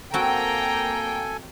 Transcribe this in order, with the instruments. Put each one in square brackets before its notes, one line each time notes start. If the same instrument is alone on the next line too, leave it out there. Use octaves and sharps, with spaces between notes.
[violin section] A#3 G5 [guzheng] C4 F#4 [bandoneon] A4 G#5 [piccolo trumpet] A#5